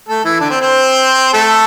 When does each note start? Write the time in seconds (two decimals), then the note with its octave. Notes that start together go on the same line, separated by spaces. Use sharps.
0.09 A3 A4
0.24 E3 E4
0.40 D3 D4
0.50 C4
0.61 C4 C5
1.33 A3 A4